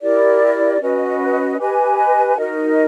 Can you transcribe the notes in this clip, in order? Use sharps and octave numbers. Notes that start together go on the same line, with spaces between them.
E4 G4 A#4 D5
C#4 F#4 B4 D#5
G4 B4 D#5 G#5
D#4 F#4 A#4 D#5